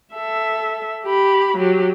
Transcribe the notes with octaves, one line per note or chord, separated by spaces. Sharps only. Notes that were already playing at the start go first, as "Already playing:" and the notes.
A4 E5
G4 B5
F#3 G4